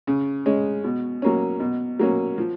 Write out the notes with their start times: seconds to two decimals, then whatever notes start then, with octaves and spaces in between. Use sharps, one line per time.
0.07 C#3
0.46 G#3 C#4
0.84 B2
1.22 F#3 A#3 C#4
1.60 B2
1.99 F#3 A#3 C#4
2.38 F3